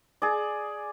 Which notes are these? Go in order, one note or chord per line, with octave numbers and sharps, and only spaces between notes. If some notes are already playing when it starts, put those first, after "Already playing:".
G#4 D5